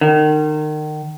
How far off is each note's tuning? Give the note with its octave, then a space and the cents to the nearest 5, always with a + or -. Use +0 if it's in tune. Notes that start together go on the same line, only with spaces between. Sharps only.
D#3 -30